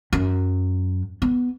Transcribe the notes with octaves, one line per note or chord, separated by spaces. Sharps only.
F#2
B3